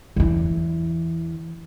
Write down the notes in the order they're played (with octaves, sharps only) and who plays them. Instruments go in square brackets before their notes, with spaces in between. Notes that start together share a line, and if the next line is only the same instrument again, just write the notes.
[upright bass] E2 E3